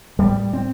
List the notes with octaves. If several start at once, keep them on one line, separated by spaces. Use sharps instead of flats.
A2 G3
C4